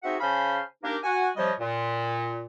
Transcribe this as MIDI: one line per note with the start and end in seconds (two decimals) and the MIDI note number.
0.03 0.16 60
0.03 0.16 63
0.03 0.16 66
0.03 0.16 68
0.03 0.16 76
0.03 0.16 78
0.20 0.60 49
0.20 0.60 72
0.20 0.60 77
0.20 0.60 80
0.20 0.60 81
0.20 0.60 83
0.82 0.96 58
0.82 0.96 62
0.82 0.96 63
0.82 0.96 67
0.82 0.96 70
1.03 1.29 66
1.03 1.29 78
1.03 1.29 80
1.36 1.51 48
1.36 1.51 53
1.36 1.51 55
1.36 1.51 73
1.36 1.51 75
1.59 2.46 46